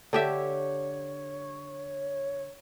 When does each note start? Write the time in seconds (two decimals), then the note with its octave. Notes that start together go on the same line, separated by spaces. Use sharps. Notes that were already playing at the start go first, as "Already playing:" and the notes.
0.13 D3 G4 C#5 E5